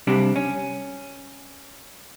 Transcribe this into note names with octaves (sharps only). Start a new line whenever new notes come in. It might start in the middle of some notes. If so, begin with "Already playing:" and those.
C3 G3 D4
C#4